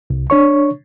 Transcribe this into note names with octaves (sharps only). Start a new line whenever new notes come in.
C2
D4 C#5 C#6